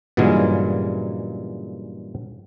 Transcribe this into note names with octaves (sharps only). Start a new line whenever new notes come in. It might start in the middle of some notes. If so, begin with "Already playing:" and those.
G2 A#2 C#3 E3 F#3 G#3